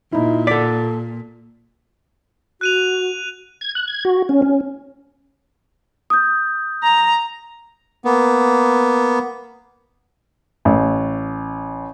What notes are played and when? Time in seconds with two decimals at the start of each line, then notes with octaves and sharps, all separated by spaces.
0.12 A#2 D#4 E4
0.47 A4 D5 B6
2.61 F#4 F#6 D#7 F7
3.61 G#6
3.75 F#6
3.88 G#6
4.05 F#4
4.29 C#4
4.42 C#4
6.10 D#6 G6
6.83 A#5
8.05 A#3 B3
10.65 A1